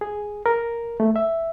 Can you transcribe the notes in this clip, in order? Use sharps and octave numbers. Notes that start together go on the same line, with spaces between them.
G#4
A#4
A3
E5